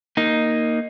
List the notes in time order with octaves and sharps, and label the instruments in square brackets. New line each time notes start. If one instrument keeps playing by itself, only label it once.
[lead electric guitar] A#3 D#4